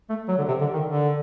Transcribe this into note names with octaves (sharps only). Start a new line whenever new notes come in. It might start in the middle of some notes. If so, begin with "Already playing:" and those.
A3
F#3
D3
C3
D3
D#3
D3